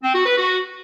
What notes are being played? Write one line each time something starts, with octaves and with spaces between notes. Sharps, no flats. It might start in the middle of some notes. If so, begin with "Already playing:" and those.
C4
F#4
B4
F#4